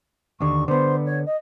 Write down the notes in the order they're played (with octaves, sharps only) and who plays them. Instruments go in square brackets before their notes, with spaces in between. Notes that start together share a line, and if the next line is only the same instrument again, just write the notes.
[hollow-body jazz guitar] D#2 D3 [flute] C#6
[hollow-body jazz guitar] D3 B3 [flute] C5
[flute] C#5
D#5